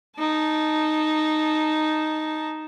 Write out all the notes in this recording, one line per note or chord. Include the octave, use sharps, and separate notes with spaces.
D#4 A5